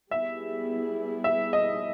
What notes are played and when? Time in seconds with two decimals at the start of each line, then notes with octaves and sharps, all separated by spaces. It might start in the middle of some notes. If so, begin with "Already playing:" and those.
0.11 G3 B3 E4 G#4 E5
1.24 E5
1.53 D#5